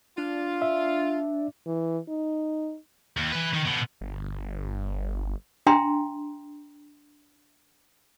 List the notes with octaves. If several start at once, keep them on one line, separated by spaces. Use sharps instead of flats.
D4 F4
E5
E3
D#4
D#2
E3 B4
D#3
B2 D3
G1
D4 E5 G5 A#5 C6